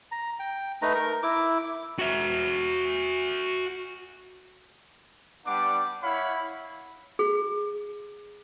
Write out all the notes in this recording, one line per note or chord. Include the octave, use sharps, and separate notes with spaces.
A#5
G5
A3 D#4 B4 A#5
A#4
E4 D6
F#4 E5
G3 B3 D4 F#5 D6
E4 C#5 F5 F#5 B5
G#4